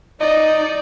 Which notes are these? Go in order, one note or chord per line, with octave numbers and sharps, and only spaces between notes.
D#4 D5 D#5